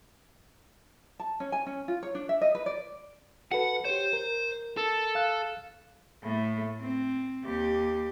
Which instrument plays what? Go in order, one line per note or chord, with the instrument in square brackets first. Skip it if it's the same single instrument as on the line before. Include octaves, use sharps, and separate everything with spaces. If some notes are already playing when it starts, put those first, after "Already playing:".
[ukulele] A5
C#4
G#5
C#4
F4
C#5
D4
E5
D#5
B4
D5
[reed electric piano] F#4 A4 B4 [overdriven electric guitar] F#5
[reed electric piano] G4 C#5 [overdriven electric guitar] C5
[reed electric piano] A#4
[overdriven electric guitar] A4
[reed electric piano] F5 F#6
[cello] A2 A3
C4
D#2 G4